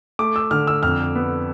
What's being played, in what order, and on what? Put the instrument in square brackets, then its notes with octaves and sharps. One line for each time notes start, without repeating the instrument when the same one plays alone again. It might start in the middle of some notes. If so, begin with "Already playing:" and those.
[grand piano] A3 D6
E6
D3 F6
E6
F2 F6
B3